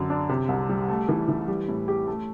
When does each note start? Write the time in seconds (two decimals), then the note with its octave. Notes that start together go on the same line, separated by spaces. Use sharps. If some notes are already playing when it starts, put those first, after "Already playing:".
Already playing: F#2 D3
0.10 D4
0.29 C3
0.49 C2
0.69 G3
0.88 A3
1.09 E3
1.28 E3
1.48 G3
1.68 A2
1.88 G4
2.07 A3